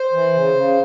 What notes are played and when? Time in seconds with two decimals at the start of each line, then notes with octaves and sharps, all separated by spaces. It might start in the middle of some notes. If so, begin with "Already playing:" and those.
Already playing: C5
0.13 E3
0.34 C#3
0.54 C#3